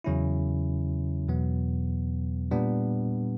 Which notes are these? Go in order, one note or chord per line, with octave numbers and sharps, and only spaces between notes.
E2 C#3 F#3 C#4 E4
E2 B2 F#3 B3
A#2 G3 B3 D4